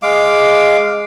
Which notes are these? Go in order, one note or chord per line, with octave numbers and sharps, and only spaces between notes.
G#3 F5 D6